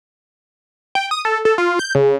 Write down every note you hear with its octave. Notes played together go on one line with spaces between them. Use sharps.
G5
D#6
A4
A4
F4
G6
C#3